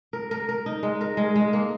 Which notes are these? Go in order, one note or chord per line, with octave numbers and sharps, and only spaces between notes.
A#4
A#4
A#4
D#4
G#3
A#4
G#3
G#3
A#3